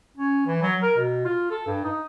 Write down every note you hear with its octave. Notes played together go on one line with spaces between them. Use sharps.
C#4
E3
F#3
A#4
B2
F4
A4
G2
D#4